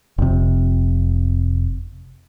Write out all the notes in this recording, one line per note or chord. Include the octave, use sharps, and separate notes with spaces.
F1 C3